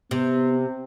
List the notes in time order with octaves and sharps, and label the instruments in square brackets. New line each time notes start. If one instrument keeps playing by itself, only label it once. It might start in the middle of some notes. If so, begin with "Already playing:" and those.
[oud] C3 [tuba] B3